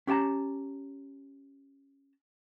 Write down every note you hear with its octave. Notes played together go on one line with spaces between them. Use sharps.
C#4 G4 G5 A5 A#5